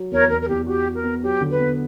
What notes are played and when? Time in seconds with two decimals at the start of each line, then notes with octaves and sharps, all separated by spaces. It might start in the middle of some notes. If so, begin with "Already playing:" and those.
Already playing: F#3
0.11 E2 A#4 C#5
0.29 E2 A#4
0.40 A#4
0.48 E2 G4
0.67 F#4 G4
0.85 F#4
0.94 A#4
1.04 B3
1.22 F#3 G4
1.41 D3
1.50 B4
1.59 B3